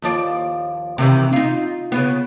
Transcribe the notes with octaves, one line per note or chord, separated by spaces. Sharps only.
D#2 F3 D5
C3 D#3 E3
D#4 F4
C#3 B3